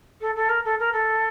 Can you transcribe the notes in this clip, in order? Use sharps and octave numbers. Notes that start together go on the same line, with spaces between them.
A4
A4
A#4
A4
A#4
A4